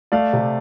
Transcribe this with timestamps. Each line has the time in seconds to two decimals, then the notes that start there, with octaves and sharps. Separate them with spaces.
0.12 A3 D5 F5
0.33 C3